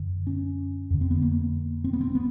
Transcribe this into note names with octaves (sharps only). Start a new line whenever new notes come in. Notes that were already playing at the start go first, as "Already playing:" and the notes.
Already playing: F#2 D3
C#4
F2 D3
C4
B3
A#3
C4
B3
C4
B3